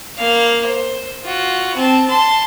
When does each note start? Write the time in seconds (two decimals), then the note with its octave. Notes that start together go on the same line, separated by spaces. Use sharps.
0.18 A#3 F5
0.66 C5
1.25 F4 F#4
1.75 C4 A5
2.06 A5 C6